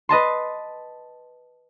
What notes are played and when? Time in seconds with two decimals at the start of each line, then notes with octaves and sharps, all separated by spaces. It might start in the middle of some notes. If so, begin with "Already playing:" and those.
0.09 B4 D#5 A5 C6